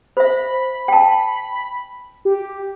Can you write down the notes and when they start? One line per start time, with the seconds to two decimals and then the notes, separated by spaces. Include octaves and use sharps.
0.17 C5 E5 B5
0.88 G5 A5
2.25 G4